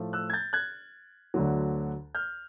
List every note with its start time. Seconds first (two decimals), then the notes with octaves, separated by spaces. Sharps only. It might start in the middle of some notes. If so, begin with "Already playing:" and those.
Already playing: A2 F3 A3
0.13 E6 F#6
0.30 G#6
0.33 G6 A6
0.53 F#6 G#6
1.34 D2 D3 F#3
2.15 F6 G6